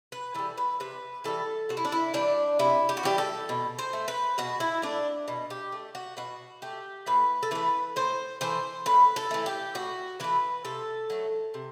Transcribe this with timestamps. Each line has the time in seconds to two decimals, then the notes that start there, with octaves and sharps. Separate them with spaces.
0.12 B4
0.35 E3 G3 A4
0.58 B4
0.80 C3 B4
1.24 E3 G3 A4
1.69 C3 F#4
1.77 E4
1.85 D4
1.92 E4
2.14 E3 G3 D4
2.59 C3 E4
2.89 G4
2.97 F#4
3.03 E3 G3 G4
3.18 A4
3.49 B2
3.79 C5
3.93 A3
4.08 B4
4.38 B2 F#4
4.60 E4
4.82 A3 D4
5.28 B2
5.50 G4
5.72 A3
5.95 F#4
6.17 B2 F#4
6.62 A3 G4
7.06 A2 B4
7.43 A4
7.51 E3 A3 B4
7.96 A2 C5
8.41 E3 A3 C5
8.86 A2 B4
9.16 A4
9.31 E3 A3
9.46 G4
9.75 A2 F#4
10.20 E3 A3 B4
10.65 C3 A4
11.10 F#3 A3
11.54 C3